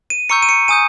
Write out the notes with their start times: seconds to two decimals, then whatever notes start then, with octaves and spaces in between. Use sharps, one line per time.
0.10 D#7
0.29 A#5 C#6 E6 G6 C#7
0.42 D#7
0.49 C#7
0.68 G#5 D#6 G6 D#7